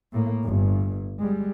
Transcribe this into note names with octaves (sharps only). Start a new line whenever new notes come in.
A2 A#3
G1 G2
G3 G#3